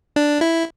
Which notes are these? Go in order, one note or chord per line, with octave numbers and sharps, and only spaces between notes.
D4
E4